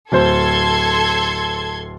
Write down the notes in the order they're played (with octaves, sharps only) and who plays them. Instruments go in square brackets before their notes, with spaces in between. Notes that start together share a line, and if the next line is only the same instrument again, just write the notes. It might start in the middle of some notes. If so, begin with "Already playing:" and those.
[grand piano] D1 C5 [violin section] A4 C6 G#6